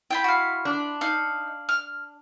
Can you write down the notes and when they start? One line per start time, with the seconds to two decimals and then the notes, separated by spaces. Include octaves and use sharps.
0.10 E4 F4 G5 B5
0.24 F#4 F5
0.65 D4
1.01 D#4 F5
1.69 F6